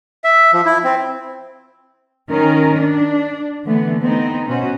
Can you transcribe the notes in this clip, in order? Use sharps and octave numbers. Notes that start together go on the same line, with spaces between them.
E5
F3
E4
C4
D#3 C#4 A#4
D4
D3 E3 A3 B3
B3 C4 D#4
B2 C#4 F#4 C5